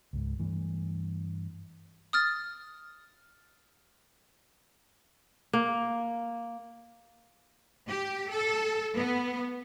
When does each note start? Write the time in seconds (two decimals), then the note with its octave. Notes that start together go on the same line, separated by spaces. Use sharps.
0.13 C#2 G#2
0.39 G2 E3 A3
2.13 D#6 F6 A6
5.53 A#3
7.88 G4
8.30 A4
8.95 B3